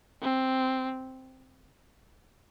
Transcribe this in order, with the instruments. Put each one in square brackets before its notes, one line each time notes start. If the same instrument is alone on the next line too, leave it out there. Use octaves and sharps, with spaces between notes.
[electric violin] C4